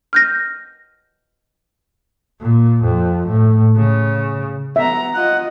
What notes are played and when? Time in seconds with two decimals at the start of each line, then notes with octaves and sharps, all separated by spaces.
0.13 F6 G6 A#6
2.41 A#2
2.83 F2
3.28 A2
3.76 C#3
4.76 B3 E5 A#5
5.14 F4 D#5 F#5